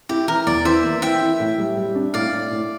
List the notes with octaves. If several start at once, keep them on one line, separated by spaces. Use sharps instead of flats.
E4 G4
E3 A#4
E2 D5
E3 C5 E5
A#3
E3 E5 G5
E4
A2
G3
G3
D4
A2 D5 F5
A2
A2